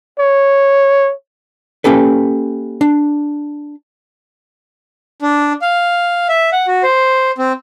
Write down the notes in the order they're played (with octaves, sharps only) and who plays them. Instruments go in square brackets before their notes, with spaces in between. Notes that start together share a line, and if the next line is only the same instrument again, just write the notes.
[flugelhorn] C#5
[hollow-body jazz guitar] A#3 C#4 G4 A4 B4
D4
[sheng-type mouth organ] D4
F5
E5
F#5
F#4
C5
C4